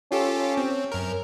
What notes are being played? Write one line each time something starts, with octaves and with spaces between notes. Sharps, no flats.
C#4 F4 G4 A4
C4
F#2 A#4